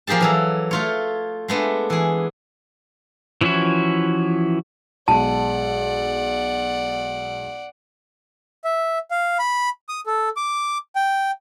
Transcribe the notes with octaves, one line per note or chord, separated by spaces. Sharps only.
F3 A#3 G4 G#4 A5
E3 F#3 A4
A3 F4 C#5
G#3 A3 B3 D4
E3 G#4
E3 F3 C#4 E4 F#4
B1 G#3 D5 F#5 A5
E5
F5
B5
D#6
A4
D6
G5